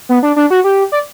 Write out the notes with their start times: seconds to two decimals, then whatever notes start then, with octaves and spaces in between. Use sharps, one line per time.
0.09 B3
0.23 D4
0.36 D4
0.50 F#4
0.64 G4
0.92 D5